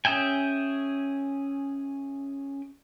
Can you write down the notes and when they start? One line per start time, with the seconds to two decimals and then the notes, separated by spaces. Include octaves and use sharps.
0.05 C#4 G#4 E5 G5 G#5